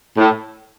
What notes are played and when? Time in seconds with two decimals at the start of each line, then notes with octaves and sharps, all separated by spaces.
0.18 A2